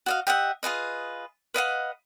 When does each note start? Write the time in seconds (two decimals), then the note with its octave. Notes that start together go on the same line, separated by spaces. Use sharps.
0.06 F#4 D#5 F5
0.27 G4 D#5 E5 F#5
0.63 F4 G#4 B4 D#5
1.54 B4 D#5 F5 F#5